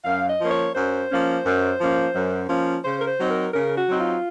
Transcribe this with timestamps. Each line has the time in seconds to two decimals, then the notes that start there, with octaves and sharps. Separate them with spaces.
0.04 F#2 F5
0.29 D#5
0.40 F3 A#3 C#4
0.51 C#5
0.74 F#2 C5
1.10 F3 A#3 C#4
1.44 F#2
1.79 F3 A#3 C#4
2.14 F#2
2.49 F3 A#3 C#4
2.83 C#3 C5
3.01 A#4
3.07 C5
3.19 F#3 C4 D#4
3.30 A#4
3.53 C#3 A#4
3.76 F#4
3.88 F#3 C4 D#4
4.00 F4